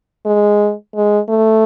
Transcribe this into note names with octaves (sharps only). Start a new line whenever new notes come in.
G#3
G#3
A3